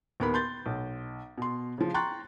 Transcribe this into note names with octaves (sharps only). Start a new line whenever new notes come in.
D#2 B3 A#4 B5
C6 G6 A6
B1
B2 C6
C#3 F3
G5 A#5 C6 C#6 F#6 A6